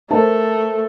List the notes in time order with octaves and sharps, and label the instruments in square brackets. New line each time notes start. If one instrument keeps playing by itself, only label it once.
[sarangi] A3 [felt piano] A#4 C5 A5